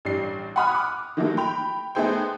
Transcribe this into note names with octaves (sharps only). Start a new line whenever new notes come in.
A1 G3 D4 C7
F#5 G#5 B5 D#6 F6 F#6
D6
D#3 E3 F#3 G3 A3 A#3
G5 B5 F7
A3 B3 D#4 G#4 C5 G5